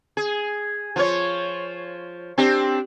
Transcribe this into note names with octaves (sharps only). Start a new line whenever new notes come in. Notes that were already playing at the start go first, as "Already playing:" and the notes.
G#4
F3 F4 C#5
C4 D4 G4